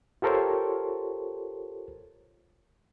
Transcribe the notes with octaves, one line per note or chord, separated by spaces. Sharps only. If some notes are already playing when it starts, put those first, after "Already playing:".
F4 G4 A4 A#4 C5 C#5